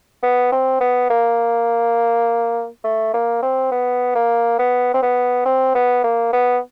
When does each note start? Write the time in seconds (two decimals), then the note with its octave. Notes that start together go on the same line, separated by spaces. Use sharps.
0.23 B3
0.52 C4
0.80 B3
1.10 A#3
2.84 A3
3.13 A#3
3.42 C4
3.72 B3
4.15 A#3
4.59 B3
4.94 C4
5.02 B3
5.45 C4
5.75 B3
6.04 A#3
6.33 B3